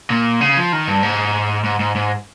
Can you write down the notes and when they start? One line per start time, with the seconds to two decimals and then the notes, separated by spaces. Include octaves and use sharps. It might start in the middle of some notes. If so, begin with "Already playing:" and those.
0.10 A#2
0.41 C#3
0.57 F3
0.73 D#3
0.88 G2
1.02 G#2
1.64 G#2
1.80 G#2
1.95 G#2